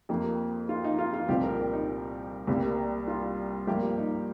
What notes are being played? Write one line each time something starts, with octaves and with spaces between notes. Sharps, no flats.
F2 F3 A#3 G4
F4
D#4
F4
F4
C2 A#2 F3 C4 G4
A#4
G4
D#4
C2 C3 G3 A#3
F4
G2 F3 A#3 G4
D#4